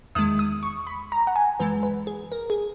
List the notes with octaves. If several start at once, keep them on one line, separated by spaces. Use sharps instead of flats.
E2 D#3 G#3 D#6
D#6
C#6
B5
A#5
F#5
G#5
F#2 E3 G#3 B4
B4
G#4
A#4
G#4